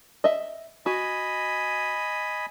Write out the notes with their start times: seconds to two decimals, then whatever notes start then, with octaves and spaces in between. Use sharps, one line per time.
0.24 D#5 E5
0.86 F#4 D#5 G#5 B5